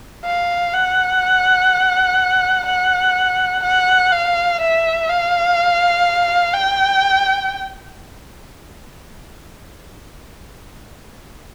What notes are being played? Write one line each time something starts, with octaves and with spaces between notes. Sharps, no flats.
F5
F#5
F#5
F#5
F5
E5
F5
G5